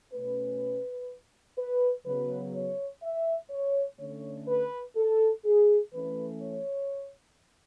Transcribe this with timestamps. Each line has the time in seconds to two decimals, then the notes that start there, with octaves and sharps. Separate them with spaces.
0.12 B2 A3 C#4 B4
1.58 B4
2.06 C#3 F#3 B3 B4
2.54 C#5
3.03 E5
3.50 C#5
3.99 D3 A3 C#4 C#5
4.48 B4
4.96 A4
5.45 G#4
5.93 E3 A3 C#4 B4
6.41 C#5